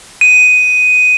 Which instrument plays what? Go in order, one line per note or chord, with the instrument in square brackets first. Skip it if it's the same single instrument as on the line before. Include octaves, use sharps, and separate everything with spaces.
[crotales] D#7